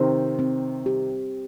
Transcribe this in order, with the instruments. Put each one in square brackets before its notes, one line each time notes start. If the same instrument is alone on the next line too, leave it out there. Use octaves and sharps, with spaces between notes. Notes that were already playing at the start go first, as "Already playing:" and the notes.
Already playing: [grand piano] C3 D#3 [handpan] C5
[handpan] C4
G4